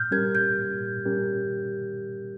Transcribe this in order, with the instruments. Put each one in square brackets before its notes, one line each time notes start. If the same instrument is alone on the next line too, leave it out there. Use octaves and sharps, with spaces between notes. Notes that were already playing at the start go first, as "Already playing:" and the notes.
Already playing: [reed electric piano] A#2 [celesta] F6 G6
[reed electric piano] G3 C#4 G4 A#4 [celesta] G#6
[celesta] G6
[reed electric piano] A#2
G3 C#4 G4 A#4